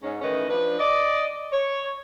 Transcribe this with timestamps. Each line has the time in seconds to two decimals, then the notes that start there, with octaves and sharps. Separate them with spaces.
0.02 G#2 C#4
0.21 A2 D#3 E3 C#4 B4 D#5
0.49 F3 D4 B4
0.79 D5 D#5
1.52 C#5